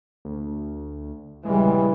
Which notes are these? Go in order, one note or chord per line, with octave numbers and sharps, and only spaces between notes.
D2
A#1 C#3 E3 G3 G#3